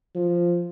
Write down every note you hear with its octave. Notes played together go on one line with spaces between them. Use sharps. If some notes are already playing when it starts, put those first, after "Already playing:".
F3